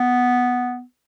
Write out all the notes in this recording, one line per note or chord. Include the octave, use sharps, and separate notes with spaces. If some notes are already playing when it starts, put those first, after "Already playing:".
Already playing: B3